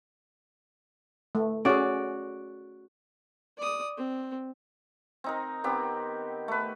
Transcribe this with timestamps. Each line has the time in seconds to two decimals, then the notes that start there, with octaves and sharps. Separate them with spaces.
1.35 A3
1.65 C#4 F#4 G#4 D5
3.58 D5 D#6
3.97 C4
5.24 C4 D#4 A#4
5.64 D#3 B3 C4 G4
6.48 A3 B4